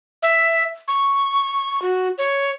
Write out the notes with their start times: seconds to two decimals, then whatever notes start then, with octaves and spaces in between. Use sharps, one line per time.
0.23 E5
0.88 C#6
1.82 F#4
2.18 C#5